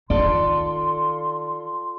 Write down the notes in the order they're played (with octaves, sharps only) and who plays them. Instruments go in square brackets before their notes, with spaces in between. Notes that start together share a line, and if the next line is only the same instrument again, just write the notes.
[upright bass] D#3 [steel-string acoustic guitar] F4 A4 D5 [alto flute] C6